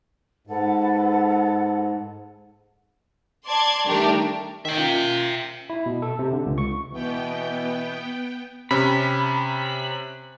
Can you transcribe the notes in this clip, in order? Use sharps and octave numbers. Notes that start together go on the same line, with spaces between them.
G#2 A4 B4 F#5
D5 A5 C6 G#6
D#3 G3 A3 D4 G4 A#4
D#3 E5 G5
A#3 C#4 F4
E4
B2
A4
C3
D3
C#2
C#6
B2 E3 B3 G5
C3 C#4 B5